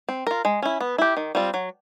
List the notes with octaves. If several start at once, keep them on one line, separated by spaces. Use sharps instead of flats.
C4
F4 A#4
G#3
C#4 E4
B3
E4 G4
D#3
G3 C4 F4
F#3